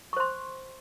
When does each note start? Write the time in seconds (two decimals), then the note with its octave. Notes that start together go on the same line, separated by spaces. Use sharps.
0.13 C#6
0.16 C5
0.20 C6